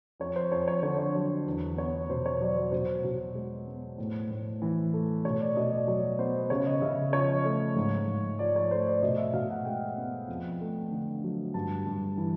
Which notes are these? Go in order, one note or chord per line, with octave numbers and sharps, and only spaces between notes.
F2 C#5
C5
F2 C#5
C#5
D3 C#5
C#5
F#3
E2
B3 C#5
B2 C5
C#5
F#3 D5
C5
B2 C5
B2
G#3
B3
A2
A2
E3
A3
B2 C#5
D5
B2 D#5
D5
F#3 C#5
B3 C5
C#3 C#5
D#5
C#3 E5
F3 C#5
A3
G#2
G#2
F3 D5
C#5
A3 C5
D5
B2 D#5
E5
B2 F5
F#5
G#3 G5
B3
F2
A3
D3
F#3
G2 A5
G2
E3